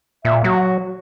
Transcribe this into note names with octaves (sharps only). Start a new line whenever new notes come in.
A#2 E5
F#3 F#4